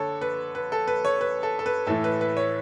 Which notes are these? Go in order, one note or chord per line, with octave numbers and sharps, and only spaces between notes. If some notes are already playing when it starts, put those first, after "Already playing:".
Already playing: D3 A4 C#5
B4
B4
A4
B4
C#5
B4
A4
A4
B4
A2 E3 A3 A4
B4
B4
C#5